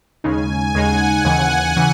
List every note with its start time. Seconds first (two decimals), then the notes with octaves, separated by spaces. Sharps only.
0.24 D#2 C#3 G#3 D#4 G#5
0.74 D#2 C#3 G#3 D#4 F#5
1.25 D#2 C#3 E3
1.76 C#3 E3